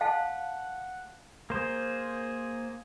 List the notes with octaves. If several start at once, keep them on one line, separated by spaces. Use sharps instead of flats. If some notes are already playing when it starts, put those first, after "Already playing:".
F5 F#5 A5
A#3 G#4 C5